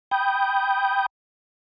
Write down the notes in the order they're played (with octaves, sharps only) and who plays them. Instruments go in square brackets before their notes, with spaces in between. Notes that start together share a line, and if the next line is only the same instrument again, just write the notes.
[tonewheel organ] G5 B5 D#6 G6